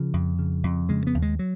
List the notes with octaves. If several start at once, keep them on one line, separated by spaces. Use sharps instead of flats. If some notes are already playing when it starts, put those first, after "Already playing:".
Already playing: C#3 F3
F2
C#3
F2
C#3 G#3
B3
D#2
G#3
F#3